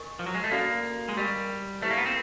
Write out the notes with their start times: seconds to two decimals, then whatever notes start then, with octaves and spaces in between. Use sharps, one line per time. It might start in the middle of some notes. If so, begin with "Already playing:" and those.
Already playing: A#4 D#5 G#5 C#6
0.19 F3
0.26 F#3
0.35 G#3
0.44 A3
0.51 A#3 C#4 F#4 A4 D5 F5
1.09 G#3
1.17 G3 G4 A#4 D#5 G#5
1.82 A3 E4 G4 B4 E5
1.90 A#3
1.98 B3
2.06 C4